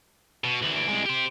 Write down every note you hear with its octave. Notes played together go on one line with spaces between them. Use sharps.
B2
D2 E3 F#7
D7
C2 G#3
G4 C5